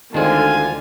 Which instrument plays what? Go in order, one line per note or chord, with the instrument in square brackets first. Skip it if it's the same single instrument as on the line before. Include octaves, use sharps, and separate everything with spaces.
[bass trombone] D2 [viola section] D3 [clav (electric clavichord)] D#3 G#3 C4 [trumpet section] F4 F5 G#5